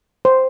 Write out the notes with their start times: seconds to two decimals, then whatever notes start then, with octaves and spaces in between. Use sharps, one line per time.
0.25 C5